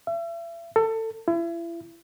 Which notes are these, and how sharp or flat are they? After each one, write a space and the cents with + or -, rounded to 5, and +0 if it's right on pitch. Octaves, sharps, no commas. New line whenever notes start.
E5 +40
A4 +25
E4 +35